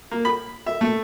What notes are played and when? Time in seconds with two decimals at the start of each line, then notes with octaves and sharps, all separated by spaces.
0.11 A#3
0.25 B5
0.66 E5
0.81 A3